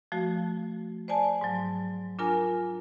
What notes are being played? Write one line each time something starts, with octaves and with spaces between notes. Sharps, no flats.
F3 A3 F#4
C5 D5 G#5 A5
G#2 F#3
D4 F4 A#4 G#5 A#5